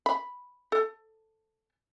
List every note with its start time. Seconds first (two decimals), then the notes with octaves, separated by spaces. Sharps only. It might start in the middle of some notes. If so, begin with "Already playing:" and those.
0.06 B5
0.72 A4